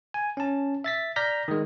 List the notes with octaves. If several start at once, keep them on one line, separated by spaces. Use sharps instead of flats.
G#5
C#4 A5
E5 A6 B6
D5 A#5 F6 G6 A#6 B6
D#3 G#3